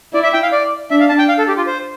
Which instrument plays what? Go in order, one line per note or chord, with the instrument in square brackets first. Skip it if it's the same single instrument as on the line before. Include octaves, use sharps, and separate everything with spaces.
[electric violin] E4 [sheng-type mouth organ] D5
[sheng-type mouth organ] E5
G5
F5
D5
[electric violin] D4 [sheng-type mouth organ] E5
[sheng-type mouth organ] F5
A5
G5
F5
A4
G4
F4
C5